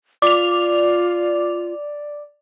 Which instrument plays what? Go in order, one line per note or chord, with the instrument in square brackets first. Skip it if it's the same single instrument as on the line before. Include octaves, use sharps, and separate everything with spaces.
[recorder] F4 [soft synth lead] D5 [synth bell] D6 F7